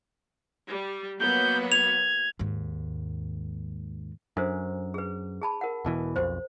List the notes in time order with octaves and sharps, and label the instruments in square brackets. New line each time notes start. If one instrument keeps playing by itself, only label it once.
[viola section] G3
[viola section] F#3 A#3 B3 [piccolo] G6
[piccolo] G#6 [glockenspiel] F7
[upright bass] D#2 G#2
[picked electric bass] F#2 [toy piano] D4 A4 C5
[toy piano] G#4 B4
G#4 A5 B5
A#4 F#5
[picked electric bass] E1 B2 E3
[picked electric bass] B1 F2 [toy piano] C5